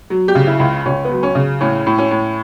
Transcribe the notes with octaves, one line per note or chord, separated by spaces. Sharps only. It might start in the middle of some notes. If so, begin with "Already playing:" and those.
F#3
G4
C#3
E4
C#2
C#2 C#4
B3
F#3
C#4
C#3
A2 C#4
A2
C#4
A2